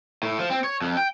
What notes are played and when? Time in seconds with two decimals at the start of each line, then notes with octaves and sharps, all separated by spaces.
0.23 A2
0.39 F3
0.51 C4
0.64 C#5
0.82 F2
0.97 G5